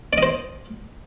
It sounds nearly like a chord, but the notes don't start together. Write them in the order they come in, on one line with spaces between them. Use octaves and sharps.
D5 D#5 C5